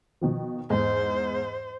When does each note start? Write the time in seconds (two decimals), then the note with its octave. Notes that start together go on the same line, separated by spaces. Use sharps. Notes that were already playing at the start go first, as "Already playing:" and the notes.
0.21 B2 D#3 F3
0.70 E2 G#2 C5